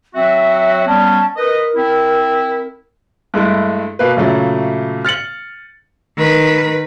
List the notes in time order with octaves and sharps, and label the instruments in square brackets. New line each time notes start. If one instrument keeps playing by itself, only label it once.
[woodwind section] F#3 C4 F#4 [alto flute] E5
[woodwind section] G3 B3 C#4 [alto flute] A5
[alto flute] A#4 [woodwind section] B4 D#5
[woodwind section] C4 E4
[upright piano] G2 G#3 A3 E4
B2 A#3 B4
A#2 C#3 F#3 A3
F6 A6 C#7 F#7
[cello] D#3 B4